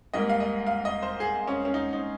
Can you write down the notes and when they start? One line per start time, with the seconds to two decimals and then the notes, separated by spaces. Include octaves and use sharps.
0.14 G#2 G3 A#3 D#5
0.30 F5
0.40 D#5
0.67 F5
0.85 D#5
1.02 C5
1.20 G#4
1.48 C#4
1.65 C#4
1.74 D#4
1.93 D#4